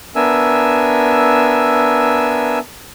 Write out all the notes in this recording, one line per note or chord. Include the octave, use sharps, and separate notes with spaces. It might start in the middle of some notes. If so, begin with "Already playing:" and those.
B3 D4 A#4 E5 G#5 E6